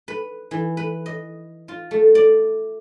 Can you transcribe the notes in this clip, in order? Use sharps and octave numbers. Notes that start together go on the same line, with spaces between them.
B4
E3
B4
D#5
F4
A3
D5